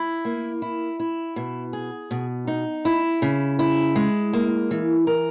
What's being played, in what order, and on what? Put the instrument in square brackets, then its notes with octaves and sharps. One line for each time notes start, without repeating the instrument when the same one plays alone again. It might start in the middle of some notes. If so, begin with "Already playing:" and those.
Already playing: [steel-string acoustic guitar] E4
A#3
E4
E4
B2
G#4
B2
D#4
E4
C#3
E4
G#3
A#3
E3
A#4